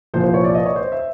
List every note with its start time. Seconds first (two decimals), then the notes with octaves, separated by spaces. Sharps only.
0.14 C2 A#2 F3 C5
0.24 C5
0.34 C#5
0.44 D5
0.54 D#5
0.66 C#5
0.76 C5
0.92 E5